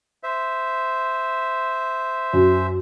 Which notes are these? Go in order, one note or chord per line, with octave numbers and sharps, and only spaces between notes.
C5 E5
F#2